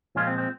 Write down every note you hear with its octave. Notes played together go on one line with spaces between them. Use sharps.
A#2 F3 G#3 C#4 F4
C4
C4